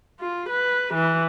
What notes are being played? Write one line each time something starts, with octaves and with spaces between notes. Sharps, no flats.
F4
B4
E3